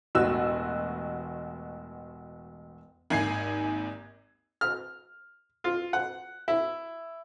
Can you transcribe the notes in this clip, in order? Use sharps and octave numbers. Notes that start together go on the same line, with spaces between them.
E1 A1 F#4 E6
G#1 D#2 G#5 G#6 C7
F6
F4
F#5
E4